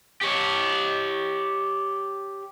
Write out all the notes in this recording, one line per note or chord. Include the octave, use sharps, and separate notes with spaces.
G4 C#5